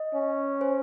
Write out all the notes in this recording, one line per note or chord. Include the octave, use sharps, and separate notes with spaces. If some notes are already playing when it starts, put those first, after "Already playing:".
Already playing: D#5
C#4
C5